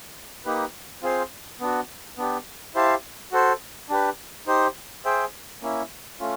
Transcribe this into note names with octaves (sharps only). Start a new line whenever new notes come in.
A#3 D#4 G4 B4
C4 F4 G#4 C5 F5
B3 D4 F#4
B3 D4 G4
E4 G4 C5 F5 A5
F#4 A4 C5
D4 G4 B4
D#4 G4 C5
G#4 C5 E5 G5
A#3 C#4 E4
A3 C#4 F4